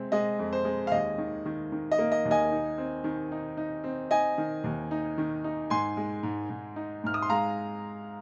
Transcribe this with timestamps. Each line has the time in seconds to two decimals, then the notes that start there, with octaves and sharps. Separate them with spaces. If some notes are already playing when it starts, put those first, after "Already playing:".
Already playing: C3 G#3 C4
0.12 G#3 D#5
0.39 F2
0.53 C5
0.65 G#3
0.87 F5
0.92 D#2 D#5
1.18 D#3
1.46 D#3
1.72 D#3
1.92 D#5
1.98 A#3
2.12 D#5
2.25 D#2
2.31 D#5 G#5
2.51 D#4
2.78 C4
3.04 D#3
3.32 D#4
3.57 D#4
3.84 C4
4.11 D#4 D#5 G#5
4.38 D#3
4.64 D#2
4.91 D#4
5.18 D#3
5.44 D#4
5.70 G#2 G#5 C6
5.97 G#3
6.23 G#2
6.50 G#2
6.76 D#4
7.04 G#2 F6
7.14 D#6
7.22 C6
7.29 G#3 F5 A#5